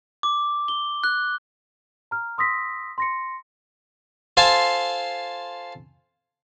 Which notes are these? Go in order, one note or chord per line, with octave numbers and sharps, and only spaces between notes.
D6
G7
F#6
A#5 F6
C6 D#6 E6 A#6 B6
C6 A#6 C#7
F4 A4 C5 F5 G#5 A5